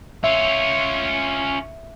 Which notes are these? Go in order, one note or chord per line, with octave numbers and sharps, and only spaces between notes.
C#4 F4 E5